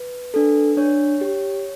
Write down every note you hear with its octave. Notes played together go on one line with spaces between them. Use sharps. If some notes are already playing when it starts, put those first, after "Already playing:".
Already playing: B4
D4 A4
D4 C#5
G4